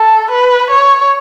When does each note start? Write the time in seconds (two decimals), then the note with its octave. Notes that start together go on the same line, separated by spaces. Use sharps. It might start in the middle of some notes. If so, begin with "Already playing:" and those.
Already playing: A4
0.31 B4
0.71 C#5